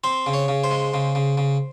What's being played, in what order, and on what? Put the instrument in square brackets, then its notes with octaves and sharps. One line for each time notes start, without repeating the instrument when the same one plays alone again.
[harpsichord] C4 C5
C#3
C#5
C#3
C5
G#3
C#3
C#3
C#3